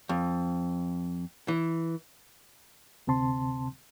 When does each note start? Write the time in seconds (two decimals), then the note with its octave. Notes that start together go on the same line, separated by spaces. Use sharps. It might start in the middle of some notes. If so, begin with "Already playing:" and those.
0.09 F2
1.48 E3
3.07 D2 C3 C4 A5 C6